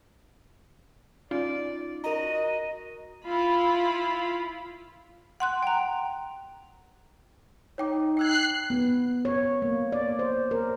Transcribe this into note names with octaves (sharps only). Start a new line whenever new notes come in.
C#4 D#4 F4 D5
F#4 A#4 D#5 A#5
E4 F4 B5
F#5 C6 F#6
G5 A#5
D#4 C#5 G5 D6
G5 E6 F#6 G#6 C7
B3
C#5
A#3
D5
C5
A#4